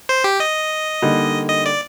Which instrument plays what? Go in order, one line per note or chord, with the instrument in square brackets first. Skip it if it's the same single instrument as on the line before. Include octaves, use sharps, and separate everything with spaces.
[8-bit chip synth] C5
G4
D#5
[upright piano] D3 G3 A#3 D#4
[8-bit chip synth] D#5
D5